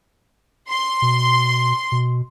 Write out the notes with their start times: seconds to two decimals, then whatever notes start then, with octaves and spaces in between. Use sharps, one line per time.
0.70 C6
1.02 B2
1.92 B2